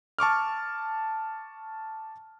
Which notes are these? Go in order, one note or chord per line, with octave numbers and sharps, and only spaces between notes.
A5 C#6 D6 F6